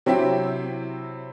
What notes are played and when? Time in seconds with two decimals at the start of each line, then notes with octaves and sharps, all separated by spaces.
0.06 C3 F#3 C4 E4 G4